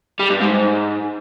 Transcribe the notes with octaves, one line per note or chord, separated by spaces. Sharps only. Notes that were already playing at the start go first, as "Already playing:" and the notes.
G3
G2
G#2